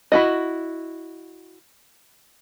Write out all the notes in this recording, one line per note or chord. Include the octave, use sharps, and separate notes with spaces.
E4 F#4 D#5